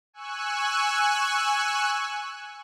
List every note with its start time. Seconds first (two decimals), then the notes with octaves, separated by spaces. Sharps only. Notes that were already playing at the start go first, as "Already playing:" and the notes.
0.14 G#5 C#6 E6 F#6